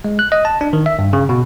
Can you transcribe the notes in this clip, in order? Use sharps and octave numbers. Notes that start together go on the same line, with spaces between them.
G#3
F#6
D#5
A5
D4
D#3
E5
G2
C#3
B2